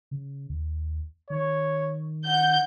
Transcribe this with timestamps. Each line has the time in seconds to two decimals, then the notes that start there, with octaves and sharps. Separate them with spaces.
0.11 C#3
0.50 D#2
1.30 D#3 C#5
2.27 F#5 G6